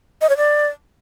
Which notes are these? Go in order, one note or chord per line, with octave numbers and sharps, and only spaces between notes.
D#5
C#5
D5